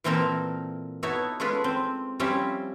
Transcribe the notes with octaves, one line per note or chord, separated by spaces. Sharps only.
A#2 E3 A#3 C4 A4 A#4
B3 D#4 E4 F#4 A4 C#5
G#3 C#4 F4 A4 B4
C4
F3 G3 C4 C#4 E4 G4